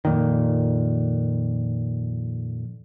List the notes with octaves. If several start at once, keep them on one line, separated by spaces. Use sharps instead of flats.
F2 A#2 D#3